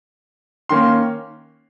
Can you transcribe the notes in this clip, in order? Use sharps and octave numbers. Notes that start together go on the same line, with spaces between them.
D#3 A#3 C#4 C6